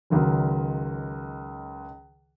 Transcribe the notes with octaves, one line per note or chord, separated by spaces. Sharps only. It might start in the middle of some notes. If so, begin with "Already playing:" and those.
C#2 D#3 F#3